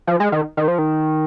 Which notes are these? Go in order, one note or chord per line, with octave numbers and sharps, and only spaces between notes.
F3
G#3
D#3
D#3
F3
D#3